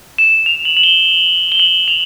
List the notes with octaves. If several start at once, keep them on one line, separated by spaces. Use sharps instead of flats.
E7
F7
F#7
F#7
G7
G7
F#7
F7